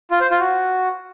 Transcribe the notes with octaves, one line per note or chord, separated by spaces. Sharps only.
F4
C5
F4
F#4